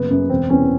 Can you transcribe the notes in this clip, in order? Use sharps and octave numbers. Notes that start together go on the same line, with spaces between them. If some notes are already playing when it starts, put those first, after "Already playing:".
Already playing: F#1 B3
F#2 C#3
E1 C4
E2 C3 E3 C#4